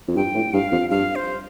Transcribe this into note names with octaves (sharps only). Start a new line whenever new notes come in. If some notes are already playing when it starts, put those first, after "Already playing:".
F2
G2 G5
A2
G2 F5
F2
G2 F5
C5